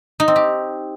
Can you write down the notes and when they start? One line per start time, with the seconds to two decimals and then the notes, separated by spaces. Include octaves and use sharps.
0.20 D#4
0.28 C4
0.36 G4